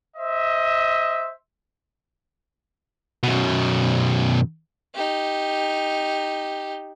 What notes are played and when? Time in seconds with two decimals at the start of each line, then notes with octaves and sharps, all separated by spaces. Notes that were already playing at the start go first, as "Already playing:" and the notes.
0.17 C5 D#5 E5
3.23 F#2 B2
4.94 D#4 G4